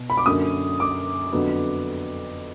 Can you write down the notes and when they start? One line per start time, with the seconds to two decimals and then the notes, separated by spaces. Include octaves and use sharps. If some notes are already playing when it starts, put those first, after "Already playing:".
Already playing: B2
0.10 B5
0.17 D6
0.26 F#2 D3 F#3 A#3 D#6
0.80 D6
1.32 F2 D3 F#3 B3